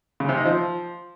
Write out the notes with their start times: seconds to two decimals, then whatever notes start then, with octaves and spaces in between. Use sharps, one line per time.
0.20 C#3
0.29 C3
0.37 D#4
0.45 F3